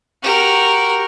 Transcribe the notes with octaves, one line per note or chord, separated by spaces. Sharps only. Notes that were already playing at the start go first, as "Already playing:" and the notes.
F#4 G4 A#4